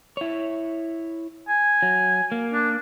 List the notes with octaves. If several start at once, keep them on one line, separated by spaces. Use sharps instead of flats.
E4 C#5
G#5
F#3
A#3
D4